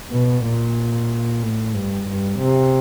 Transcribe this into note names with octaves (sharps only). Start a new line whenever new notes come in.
B2
A#2
A2
G2
G2
C3